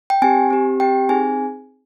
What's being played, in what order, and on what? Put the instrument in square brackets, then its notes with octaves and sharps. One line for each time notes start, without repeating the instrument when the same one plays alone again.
[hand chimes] G5
C4 G4 G#5
C4 G4
C4 G4 G5
C4 D#4 G#4 G#5